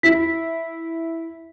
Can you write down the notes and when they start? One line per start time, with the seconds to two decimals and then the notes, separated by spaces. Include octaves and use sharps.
0.03 E4 B6